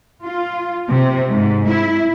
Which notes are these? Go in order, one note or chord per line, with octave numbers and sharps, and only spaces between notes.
F4
C3
G#2
E4